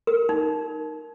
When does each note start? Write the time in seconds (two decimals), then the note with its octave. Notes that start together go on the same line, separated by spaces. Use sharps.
0.07 A#4
0.29 D#4